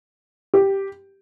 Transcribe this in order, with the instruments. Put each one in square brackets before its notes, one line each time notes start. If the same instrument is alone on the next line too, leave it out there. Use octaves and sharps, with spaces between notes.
[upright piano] G4